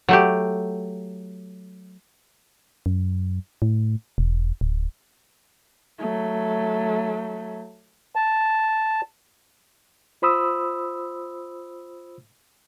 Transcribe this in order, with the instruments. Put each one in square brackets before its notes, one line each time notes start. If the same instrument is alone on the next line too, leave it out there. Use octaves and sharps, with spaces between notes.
[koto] F#3 A3 G4
[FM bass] F#2
A2
E1
D1
[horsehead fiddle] F#3 A3
[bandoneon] A5
[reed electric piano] F4 C5 B5 D#6 E6